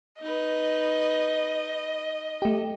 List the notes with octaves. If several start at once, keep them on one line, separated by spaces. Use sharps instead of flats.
D#4 B4 D#5
A3 G4